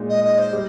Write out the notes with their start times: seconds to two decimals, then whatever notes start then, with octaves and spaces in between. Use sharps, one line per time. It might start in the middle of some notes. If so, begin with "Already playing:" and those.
Already playing: A#2 G#3 D#4
0.09 D#5
0.24 D#5
0.39 C5
0.53 G3